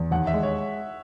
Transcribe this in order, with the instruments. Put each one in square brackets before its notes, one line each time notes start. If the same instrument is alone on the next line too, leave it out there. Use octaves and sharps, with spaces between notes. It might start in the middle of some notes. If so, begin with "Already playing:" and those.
Already playing: [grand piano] E2
[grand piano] D#2 [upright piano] F#5
[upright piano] E5
[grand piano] G#3
[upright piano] C#5